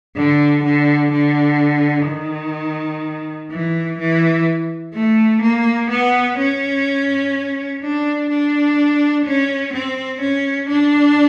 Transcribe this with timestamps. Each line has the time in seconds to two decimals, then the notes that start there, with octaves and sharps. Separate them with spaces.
0.16 D3
0.63 D3
1.12 D3
2.07 D#3
3.51 E3
3.98 E3
4.94 A3
5.42 A#3
5.90 B3
6.38 C#4
7.82 D4
8.29 D4
9.25 C#4
9.73 C4
10.21 C#4
10.69 D4